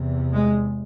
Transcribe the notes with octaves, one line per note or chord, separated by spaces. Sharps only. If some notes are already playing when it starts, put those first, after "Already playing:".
Already playing: E2 C3
G#3